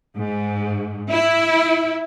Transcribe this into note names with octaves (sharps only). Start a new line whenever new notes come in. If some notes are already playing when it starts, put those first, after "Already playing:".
G#2
E4